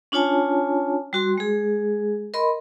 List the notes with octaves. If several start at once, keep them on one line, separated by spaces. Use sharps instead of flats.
C#4 D4 F4 C#5 G#5 A5
G3 F#4 C6
G#3 G#4
A#4 D#5 B5 C6